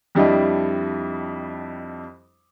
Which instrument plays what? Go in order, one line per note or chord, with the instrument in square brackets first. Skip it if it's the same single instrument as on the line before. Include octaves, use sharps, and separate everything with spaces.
[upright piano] F2 G3 D4 E4 D#5